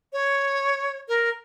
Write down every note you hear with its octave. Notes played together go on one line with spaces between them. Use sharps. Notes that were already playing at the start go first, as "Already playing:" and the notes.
C#5
A#4